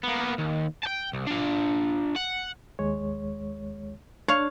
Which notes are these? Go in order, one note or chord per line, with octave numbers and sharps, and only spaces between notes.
A#3 B3
D#2
G5 A5
C2
D4 F4
F#5
D#2 G#3 C#5
D4 C#5 F5